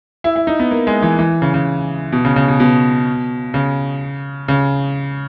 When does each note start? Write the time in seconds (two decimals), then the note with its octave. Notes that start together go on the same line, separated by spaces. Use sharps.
0.24 E4
0.36 E4
0.47 D#4
0.59 B3
0.71 A#3
0.87 G#3
1.02 E3
1.19 E3
1.42 C#3
1.54 C#3
2.12 B2
2.25 C#3
2.36 C#3
2.48 B2
2.60 B2
3.54 C#3
4.48 C#3